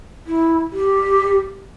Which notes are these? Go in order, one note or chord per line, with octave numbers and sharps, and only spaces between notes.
E4
G4